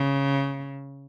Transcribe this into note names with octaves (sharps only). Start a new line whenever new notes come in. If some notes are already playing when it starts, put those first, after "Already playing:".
Already playing: C#3